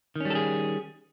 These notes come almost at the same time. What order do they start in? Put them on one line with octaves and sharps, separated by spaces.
D#3 C#4 G3 A4 G#4